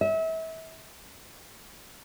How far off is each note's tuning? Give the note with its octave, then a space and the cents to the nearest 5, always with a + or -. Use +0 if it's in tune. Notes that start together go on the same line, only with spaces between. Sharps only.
E5 -35